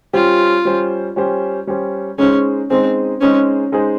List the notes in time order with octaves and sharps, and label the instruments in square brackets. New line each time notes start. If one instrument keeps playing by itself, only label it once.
[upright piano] G3 C#4 G4 C5 [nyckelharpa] F4
[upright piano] G3 C#4 G4 C5
G3 C#4 G4 C5
G3 C#4 G4 C5
[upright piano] G#3 D#4 G#4 C5 [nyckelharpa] C#4
[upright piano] G#3 D#4 G#4 C5 [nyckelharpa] C4
[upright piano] G#3 D#4 G#4 C5 [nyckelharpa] C#4
[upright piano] G#3 D#4 G#4 C5